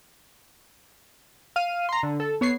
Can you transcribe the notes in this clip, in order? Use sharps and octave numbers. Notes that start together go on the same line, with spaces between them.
F5 F6 D#7
A#5 C6
D3
A4
B3 C#5 C#6 C7